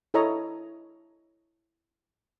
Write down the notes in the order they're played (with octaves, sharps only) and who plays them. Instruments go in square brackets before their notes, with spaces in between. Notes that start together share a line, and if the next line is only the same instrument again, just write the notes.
[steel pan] E4 A4 C#5 D#5 A#5